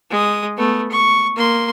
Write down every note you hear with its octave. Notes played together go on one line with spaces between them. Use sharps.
G#3 D#6
A3 B3
C#6
A#3 C6